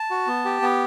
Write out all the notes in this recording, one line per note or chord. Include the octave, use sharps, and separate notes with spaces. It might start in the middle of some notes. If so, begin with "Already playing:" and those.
Already playing: A5
F#4
B3
G4
B3